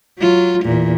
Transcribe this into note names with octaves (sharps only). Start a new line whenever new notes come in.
F#3 F4
E2 A#2